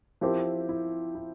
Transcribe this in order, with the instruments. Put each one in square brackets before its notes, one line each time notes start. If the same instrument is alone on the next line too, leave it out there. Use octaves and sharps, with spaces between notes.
[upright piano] F3 C4 G4 A#4 [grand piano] E4
[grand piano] E4
E4